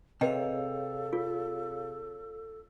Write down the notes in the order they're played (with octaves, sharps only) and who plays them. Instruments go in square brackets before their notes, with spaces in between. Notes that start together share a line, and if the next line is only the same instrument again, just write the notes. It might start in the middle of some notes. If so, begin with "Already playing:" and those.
[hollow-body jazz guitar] C3 [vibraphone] G#4 C#5 F5 [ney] A4 [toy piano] B4 D#5 G5
[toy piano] F4